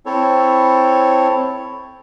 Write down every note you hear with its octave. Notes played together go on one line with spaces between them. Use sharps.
C4 E4 A4 C#5